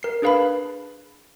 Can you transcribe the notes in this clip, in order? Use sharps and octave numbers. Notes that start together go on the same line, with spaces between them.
A#4 C7
D4 G#4 B4 F5 A5 B5